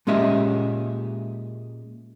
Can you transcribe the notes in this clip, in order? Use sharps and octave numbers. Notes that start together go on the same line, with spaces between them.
A#2 G#3 C#4 G4 D#5 E5